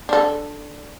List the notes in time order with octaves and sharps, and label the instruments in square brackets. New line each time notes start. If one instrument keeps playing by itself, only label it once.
[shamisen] D4 A4